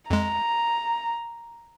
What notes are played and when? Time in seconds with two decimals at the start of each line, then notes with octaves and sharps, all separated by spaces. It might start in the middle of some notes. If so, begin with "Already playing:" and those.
0.10 F2 G#3 A#5